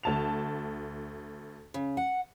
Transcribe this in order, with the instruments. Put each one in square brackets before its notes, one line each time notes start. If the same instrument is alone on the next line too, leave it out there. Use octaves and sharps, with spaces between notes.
[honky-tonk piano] D2 A5 F7
[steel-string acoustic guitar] C#3
F#5